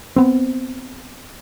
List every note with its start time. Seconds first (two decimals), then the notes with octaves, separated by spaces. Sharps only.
0.16 B3 C4